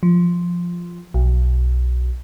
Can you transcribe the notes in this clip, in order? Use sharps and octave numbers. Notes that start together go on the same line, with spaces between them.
F3
B1